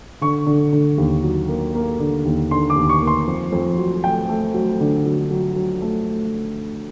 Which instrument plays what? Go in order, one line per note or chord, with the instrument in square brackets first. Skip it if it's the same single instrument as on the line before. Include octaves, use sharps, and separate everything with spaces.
[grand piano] D3 C#6
D3
D3
D#2
F#3
A#3
A#3
D3
D#2
D3 C6
D6
D#2
C#6
A#3
C6
F2
F2
F#3
A3 G5
A3
F#3
D3
F#3
F#3
F#3
A3